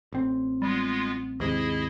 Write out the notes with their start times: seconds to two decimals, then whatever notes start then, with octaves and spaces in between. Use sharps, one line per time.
0.12 A1 C4
0.62 G3 G#3 B3 F4
1.40 D#2 G#2 C3 E4 G#4 D#5